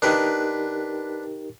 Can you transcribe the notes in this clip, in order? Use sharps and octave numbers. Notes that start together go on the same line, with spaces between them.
D4 D#4 G4 A#4 B4